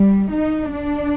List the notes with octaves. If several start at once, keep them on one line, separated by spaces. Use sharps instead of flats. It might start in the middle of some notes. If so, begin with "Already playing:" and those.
Already playing: G3
D#4
D4